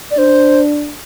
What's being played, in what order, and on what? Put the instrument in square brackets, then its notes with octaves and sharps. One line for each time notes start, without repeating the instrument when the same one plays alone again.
[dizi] D5
[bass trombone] D4 [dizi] C5